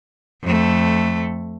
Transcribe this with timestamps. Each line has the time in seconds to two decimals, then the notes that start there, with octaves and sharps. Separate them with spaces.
0.43 F2 A3